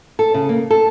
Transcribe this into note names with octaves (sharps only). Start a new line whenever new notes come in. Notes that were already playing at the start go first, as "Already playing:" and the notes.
A4
C#3
A#3
A4